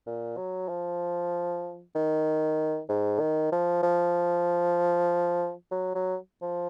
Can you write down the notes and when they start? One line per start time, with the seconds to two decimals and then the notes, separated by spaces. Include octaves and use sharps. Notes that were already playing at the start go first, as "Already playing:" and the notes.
0.07 A#2
0.37 F#3
0.69 F3
1.95 D#3
2.89 G#2
3.20 D#3
3.52 F3
3.83 F3
5.71 F#3
5.95 F#3
6.42 F3